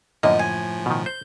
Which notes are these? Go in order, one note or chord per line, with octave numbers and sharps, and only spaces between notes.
F#2 A2 D3 F3 A#3 D#5
G#5
B2 D#3
C5 G6